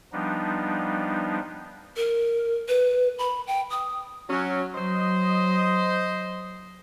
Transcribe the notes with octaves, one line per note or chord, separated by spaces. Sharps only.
F3 G3 B3 D4 D#4
A#4
B4
B5
G5
D#6
F#3 C#4
F#3 C5 D#5